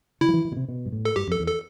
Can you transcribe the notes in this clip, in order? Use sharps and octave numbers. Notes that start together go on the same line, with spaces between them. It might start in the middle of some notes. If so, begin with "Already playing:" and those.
D3 E4
F3
E3
E3
B2
C3
B2
G2
A2
A4
G2 G4
F2
A4
E2
A4